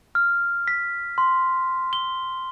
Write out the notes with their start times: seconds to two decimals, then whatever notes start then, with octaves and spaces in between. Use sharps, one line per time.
0.15 F6
0.68 B6
1.18 C6
1.93 G7